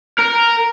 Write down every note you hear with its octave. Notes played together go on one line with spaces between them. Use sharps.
A#4